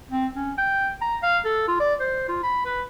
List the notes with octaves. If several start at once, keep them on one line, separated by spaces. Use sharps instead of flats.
C4
C#4
G5
A#5
F5
A4
F4
D5
C5
F4
B5
B4